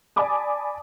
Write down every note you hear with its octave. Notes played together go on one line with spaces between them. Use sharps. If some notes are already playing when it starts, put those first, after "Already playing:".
D5 G#5 A5 B5 D6 D#6